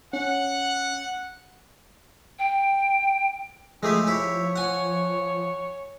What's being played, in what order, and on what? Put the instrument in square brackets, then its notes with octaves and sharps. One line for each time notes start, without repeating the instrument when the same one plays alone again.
[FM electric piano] C#4 [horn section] F#5
[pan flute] G5
[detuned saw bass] F3 [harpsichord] G#3 A3 G4 [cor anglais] G#4
[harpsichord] E4 G4 [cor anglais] C#5
[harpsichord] F#5 G#5